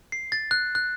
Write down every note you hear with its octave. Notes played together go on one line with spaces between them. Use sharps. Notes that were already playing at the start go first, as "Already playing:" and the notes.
C7
A6
F#6
F#6